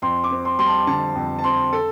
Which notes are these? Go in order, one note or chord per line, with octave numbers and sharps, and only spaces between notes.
F2 C6
D6
C4
C6
G3 C6
A5
D3 A5
F2
A5
C4 C6
A4